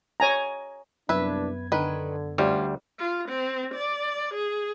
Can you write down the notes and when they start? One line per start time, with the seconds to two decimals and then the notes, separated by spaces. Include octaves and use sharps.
0.20 C#5 G#5 A#5
1.09 C2 F#2 G3 B3 D4 B4 E5 G#6
1.72 D3 D#3 B4
2.38 D2 G3 C#4 F4
2.99 F4
3.29 C4
3.74 D5
4.34 G#4